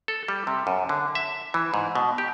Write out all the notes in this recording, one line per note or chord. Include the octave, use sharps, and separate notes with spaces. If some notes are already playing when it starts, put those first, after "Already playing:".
A4
G3
C3
F#2
D3
E5
E3
G#2
B2
G4